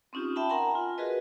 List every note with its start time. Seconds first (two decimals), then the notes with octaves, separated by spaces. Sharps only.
0.13 C4 C#4 D#4 F4 G4
0.36 E5 G5 A5 B5
0.49 A#4 F#5 G#5 A#5 C6
0.75 F4
0.98 F#4 G#4 A#4 B4 D#5